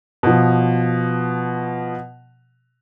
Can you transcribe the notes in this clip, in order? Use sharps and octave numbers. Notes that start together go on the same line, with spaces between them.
B2 F3